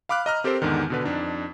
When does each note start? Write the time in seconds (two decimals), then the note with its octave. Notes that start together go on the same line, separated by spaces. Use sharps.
0.09 F5 B5 D6 F6 F#6
0.26 D#5 A#5 F6
0.44 C4 G4 A4 A#4 C5
0.62 E2 G#2 D3 D#3
0.90 B2 D3 B4
1.04 F2 D4 D#4